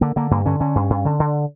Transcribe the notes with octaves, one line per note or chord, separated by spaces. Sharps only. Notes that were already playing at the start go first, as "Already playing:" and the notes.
D3 A#3
D3 A#3
G2 A#3
D3 C#4
D3 C#4
G2
G2
D3
D3